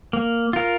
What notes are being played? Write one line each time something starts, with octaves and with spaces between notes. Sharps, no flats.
A#3
F4 A#4